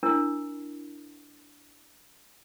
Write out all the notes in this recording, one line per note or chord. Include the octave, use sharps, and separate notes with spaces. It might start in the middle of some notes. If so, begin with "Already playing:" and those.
D4 E4 A#4